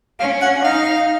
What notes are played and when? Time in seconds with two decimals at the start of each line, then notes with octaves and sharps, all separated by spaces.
0.20 C#4 F5
0.42 F#5
0.65 D#4 F5